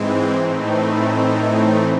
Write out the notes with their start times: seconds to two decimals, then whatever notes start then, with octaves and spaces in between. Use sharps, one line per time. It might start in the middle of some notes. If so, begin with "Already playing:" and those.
Already playing: G#2 E3 G#3 C4
0.36 A2 E3 A3 C4 D#4 C5
0.74 B4
1.11 C5
1.47 C#5